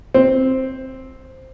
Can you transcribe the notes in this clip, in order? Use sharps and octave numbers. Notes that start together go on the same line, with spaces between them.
C4